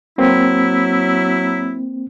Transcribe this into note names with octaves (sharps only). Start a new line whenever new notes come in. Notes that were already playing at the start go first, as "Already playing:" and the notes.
F#3 A#3 C4 E4